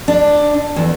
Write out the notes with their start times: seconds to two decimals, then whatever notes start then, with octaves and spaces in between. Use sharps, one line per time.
0.08 D4
0.76 E2